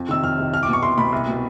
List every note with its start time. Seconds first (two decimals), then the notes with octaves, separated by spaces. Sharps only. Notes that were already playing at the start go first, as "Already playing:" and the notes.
Already playing: F2
0.09 C3 D#3 E6
0.23 F2 F6
0.38 C3 D#3
0.53 C2 F6
0.63 D6
0.68 B2 C#6
0.83 C2 C6
0.97 B2 B5
1.12 C2
1.27 B2